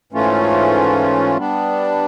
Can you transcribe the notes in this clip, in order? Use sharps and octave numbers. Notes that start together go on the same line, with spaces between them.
G#2 E3 A3 C#4 F4
G3 B3 D4